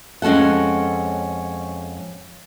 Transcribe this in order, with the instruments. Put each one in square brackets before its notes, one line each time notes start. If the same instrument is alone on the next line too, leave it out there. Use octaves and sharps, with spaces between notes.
[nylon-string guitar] F2 G#3 C#4 A4 F#5